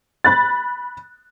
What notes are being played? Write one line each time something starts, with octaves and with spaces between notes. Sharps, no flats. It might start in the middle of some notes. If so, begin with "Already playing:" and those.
B5 F#6 A6